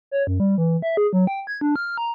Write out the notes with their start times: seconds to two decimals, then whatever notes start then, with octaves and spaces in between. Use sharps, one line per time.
0.11 C#5
0.27 F#2
0.40 G3
0.58 E3
0.82 E5
0.97 G#4
1.13 F#3
1.27 G5
1.47 G#6
1.61 D4
1.76 F6
1.98 A#5